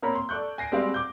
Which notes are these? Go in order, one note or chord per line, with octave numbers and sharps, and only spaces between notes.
A#3 C4 A#4 C#5 A#5 B5
C6
A4 D5 C#6 F#6 G6
G#5 A#6 C7 D7
G3 G#3 C4 F#4 B4 F5
D6 G6